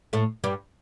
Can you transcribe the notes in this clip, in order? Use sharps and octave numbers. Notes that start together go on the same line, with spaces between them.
A2 A3
G2 G3